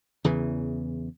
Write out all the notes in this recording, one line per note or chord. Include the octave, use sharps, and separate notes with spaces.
E2 C#3 E3